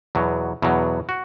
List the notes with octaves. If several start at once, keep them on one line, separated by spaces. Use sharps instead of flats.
E2 B2 F#3
E2 B2 F#3
F#4